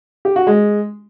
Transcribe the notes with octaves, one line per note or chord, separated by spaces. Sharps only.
G4
F#4
G#3